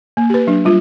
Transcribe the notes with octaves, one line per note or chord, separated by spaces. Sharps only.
A#3
G4 B4
F#3 D4
G3 F4